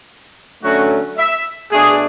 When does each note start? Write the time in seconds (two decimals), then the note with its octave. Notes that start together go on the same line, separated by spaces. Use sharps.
0.62 D3 F#3 A3 C#4 F#4
1.17 E5
1.71 B2 A3 D4 G#4